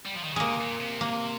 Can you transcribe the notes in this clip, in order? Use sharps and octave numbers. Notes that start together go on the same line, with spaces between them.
G3
F3
D#3
C#3
C3 G#3 A#3
A#2
C3
A#3